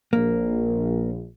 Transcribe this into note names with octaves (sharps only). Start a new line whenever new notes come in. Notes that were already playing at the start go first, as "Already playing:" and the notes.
A#1 A#3